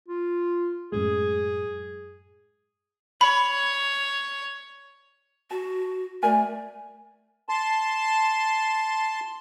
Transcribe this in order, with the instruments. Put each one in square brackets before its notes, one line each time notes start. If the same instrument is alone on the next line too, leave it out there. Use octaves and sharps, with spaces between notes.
[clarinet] F4
[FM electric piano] F#2 A2 G#3 [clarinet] G#4
[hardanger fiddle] C#5 [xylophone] B5
[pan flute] F#4 [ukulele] A5
[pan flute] A3 [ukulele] A#4 D5 G#5
[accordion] A5 C6